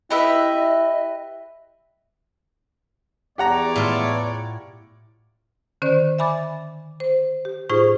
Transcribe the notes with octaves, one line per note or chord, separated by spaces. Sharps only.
E4 G4 B4 D#5 E5
E2 G4 C#5 D5 F#5 A#5
A2 F4 A5
D3 D#3 C#4 C5 D5
E5 G#5 B5 D6 A6
C5
G4
A2 D#4 F4 G#4 C5 C#6